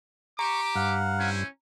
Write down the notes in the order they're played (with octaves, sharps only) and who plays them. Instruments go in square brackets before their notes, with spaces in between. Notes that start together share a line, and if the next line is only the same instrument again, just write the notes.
[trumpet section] G4 D6 [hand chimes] A#5 [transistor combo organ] C#6
[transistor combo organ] G2 [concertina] F5 F#5
[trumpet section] C#4 E4 C5